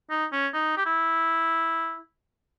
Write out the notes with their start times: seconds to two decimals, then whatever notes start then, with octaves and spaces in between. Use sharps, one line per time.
0.10 D#4
0.32 C#4
0.53 D#4
0.77 G4
0.86 E4